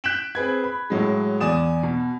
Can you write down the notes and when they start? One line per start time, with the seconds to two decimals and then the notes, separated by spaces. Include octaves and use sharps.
0.04 F#6 G6 B6 D7 E7 F#7
0.35 C4 G#4 B4 G#6
0.64 B5
0.90 A2 F#3 G#3
1.40 E2 D5 G#5 D#6 E7
1.83 B2